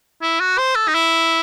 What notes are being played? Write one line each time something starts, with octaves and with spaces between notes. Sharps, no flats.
E4
F#4
C5
A4
D#4
E4